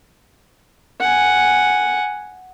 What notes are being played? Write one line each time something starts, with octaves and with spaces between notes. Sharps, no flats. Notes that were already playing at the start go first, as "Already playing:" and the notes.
F#5 G#5